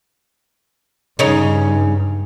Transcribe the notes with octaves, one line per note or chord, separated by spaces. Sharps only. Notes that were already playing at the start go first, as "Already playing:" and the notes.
G2 C#3 C#4 D#4